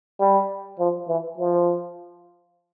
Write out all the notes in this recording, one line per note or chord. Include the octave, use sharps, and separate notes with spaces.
G3
F3
E3
F3